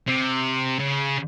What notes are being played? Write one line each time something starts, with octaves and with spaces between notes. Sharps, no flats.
C3
C#3